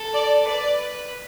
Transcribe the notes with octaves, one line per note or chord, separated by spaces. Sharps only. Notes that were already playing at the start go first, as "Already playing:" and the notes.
Already playing: A4
D5
B4 D5